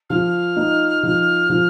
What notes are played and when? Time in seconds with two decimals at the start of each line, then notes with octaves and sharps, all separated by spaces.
0.10 F3 F6
0.57 D#4
1.03 F3
1.50 F3